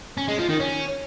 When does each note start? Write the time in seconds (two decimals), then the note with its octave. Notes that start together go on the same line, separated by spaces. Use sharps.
0.18 C#4
0.28 G#3
0.39 F3
0.49 D#3
0.60 C#4